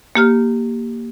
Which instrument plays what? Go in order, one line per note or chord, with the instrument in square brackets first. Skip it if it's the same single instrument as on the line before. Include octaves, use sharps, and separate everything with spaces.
[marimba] A#3 G4 F6